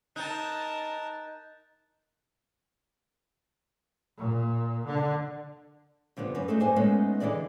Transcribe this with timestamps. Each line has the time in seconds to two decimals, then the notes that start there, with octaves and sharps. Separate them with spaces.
0.16 D#4 A#4 A5 F#6 G6 A6
4.18 A#2
4.86 D3
6.17 G2 D3 F3 G3 B3
6.35 F#2 C#4 B4
6.48 A3 A#3 D#4 F4 G#4 A4
6.60 G2 C5 G#5
6.76 G#3 A3 B3 C#4 D#4 A4
7.20 D3 E3 G#4 D5 D#5